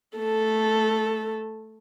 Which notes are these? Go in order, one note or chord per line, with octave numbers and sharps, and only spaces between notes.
A3 A4